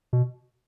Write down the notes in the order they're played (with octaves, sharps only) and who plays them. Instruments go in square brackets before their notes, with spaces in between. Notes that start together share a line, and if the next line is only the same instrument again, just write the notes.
[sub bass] B2